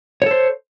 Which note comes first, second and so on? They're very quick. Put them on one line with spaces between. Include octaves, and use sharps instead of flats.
C#5 A4 C5